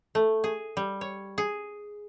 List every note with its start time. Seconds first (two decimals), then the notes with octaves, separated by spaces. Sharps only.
0.15 A3
0.44 G#4
0.77 G3
1.01 C#5
1.38 G#4